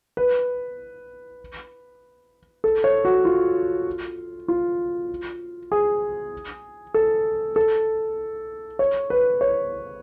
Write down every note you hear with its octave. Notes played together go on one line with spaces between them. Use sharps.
B4
A4
C#5
F#4
F4
F4
G#4
A4
A4
C#5
B4
C#5